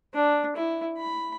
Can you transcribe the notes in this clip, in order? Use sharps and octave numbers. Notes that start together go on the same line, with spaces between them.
D4
E4
B5